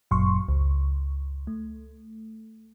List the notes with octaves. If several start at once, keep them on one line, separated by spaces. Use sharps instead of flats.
G1 F#2 A#2 F#3 C6 C#6
C#2
A3